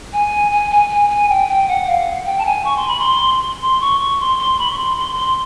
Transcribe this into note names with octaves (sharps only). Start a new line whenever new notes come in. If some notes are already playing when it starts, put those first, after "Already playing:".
G#5
G#5
G#5
G#5
G#5
G5
G5
F#5
F5
G5
A5
G#5
C#6
C6
B5
C6
C6
C#6
C#6
C6
C6
B5
C#6
C6
C6
C6